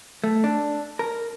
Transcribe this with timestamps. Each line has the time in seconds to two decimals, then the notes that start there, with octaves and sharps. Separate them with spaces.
0.24 A3
0.44 D4
0.99 A#4